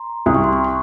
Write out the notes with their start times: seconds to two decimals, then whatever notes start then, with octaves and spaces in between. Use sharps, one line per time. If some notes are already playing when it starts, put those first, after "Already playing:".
Already playing: A#5 C6
0.26 C2 D#6
0.34 C#6
0.44 C6
0.53 C#6
0.64 C#6